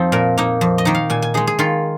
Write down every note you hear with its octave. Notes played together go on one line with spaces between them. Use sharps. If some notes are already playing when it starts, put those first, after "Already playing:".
Already playing: F2 F3 C4 D#4
A#2 A#4
A#3 D#4
F2
D#5
D#3 A#3 D#4
F5
A#2 G#5
G#5
G#3 D#4 G#4
G#4
D#3 F4